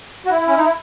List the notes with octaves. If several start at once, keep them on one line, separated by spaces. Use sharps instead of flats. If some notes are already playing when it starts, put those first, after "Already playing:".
F#4
E4
C#4
D#4
E4